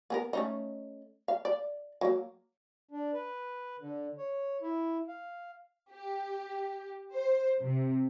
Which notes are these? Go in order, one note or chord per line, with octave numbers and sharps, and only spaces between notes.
B3 G#4 A#4
A3 C#4 D#4
F5
D5
F#3 A#3
D4
B4
D3
C#5
E4
F5
G4
C5
C3